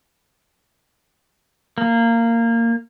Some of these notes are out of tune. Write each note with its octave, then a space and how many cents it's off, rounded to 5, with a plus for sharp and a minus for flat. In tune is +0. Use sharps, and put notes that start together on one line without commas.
A#3 -15